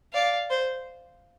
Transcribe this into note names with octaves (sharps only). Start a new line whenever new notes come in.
D5 F5
C5